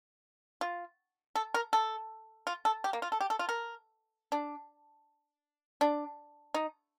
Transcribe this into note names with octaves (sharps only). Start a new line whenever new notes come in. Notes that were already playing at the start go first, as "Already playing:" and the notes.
F4
A4
A#4
A4
F4
A4
G4
A#3
F4
A4
G4
A4
F4
A#4
D4
D4
D#4